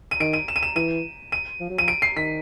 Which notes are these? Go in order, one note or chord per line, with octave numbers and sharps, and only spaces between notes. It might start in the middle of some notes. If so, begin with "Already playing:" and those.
D#7
D#3 D7
D#7
E7
D#7
E7
E3 D#7
D#7
F3
F#3
F3 D#7
D7
C7
D#3 B6